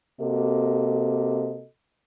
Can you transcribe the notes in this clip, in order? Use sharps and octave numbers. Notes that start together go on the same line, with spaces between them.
C3 A#3 F#4 A4 D#5